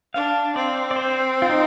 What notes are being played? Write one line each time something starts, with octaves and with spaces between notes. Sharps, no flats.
D4 F5
C4 D5
D5
C5
F4
D#4